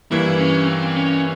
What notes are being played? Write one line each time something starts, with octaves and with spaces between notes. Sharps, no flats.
G2 E3 A#3 E4
C#4
C4
C#4